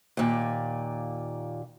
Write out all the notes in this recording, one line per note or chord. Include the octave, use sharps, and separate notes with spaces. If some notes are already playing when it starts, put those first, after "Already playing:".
D#2 A#2